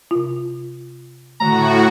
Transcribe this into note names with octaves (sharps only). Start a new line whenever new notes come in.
C3 F4
A2 D3 D#3 A3 F#4 A#5